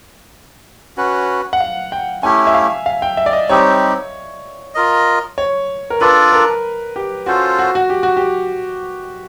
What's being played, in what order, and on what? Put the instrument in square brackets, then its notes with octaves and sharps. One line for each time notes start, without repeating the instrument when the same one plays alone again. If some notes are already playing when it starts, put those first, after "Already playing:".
[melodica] C#4 F#4 B4
[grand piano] F#5
F5
G5
[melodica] A3 C#4 E4 G4 [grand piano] G#5
[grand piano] E5
F5
F5
G5
E5
D5
D#5
[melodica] G3 C4 D#4 G4 [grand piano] C#5
[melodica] F4 A#4 D#5
[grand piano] C#5
A#4
[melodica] D4 F4 A4 D5 [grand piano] B4
[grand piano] A#4
G4
[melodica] C#4 F4 A4 C5 [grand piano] F#4
[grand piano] F#4
F#4
G4
F#4
G4